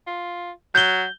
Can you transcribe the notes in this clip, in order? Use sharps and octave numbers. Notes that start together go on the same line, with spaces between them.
F4
F#3 G6 G7